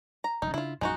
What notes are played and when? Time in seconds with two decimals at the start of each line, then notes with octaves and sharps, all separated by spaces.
0.24 A#5
0.42 F1 B1 D#4
0.54 C#3 D4 E4 F4
0.81 A#1 F#2 A#2 G#3 D#4 F#4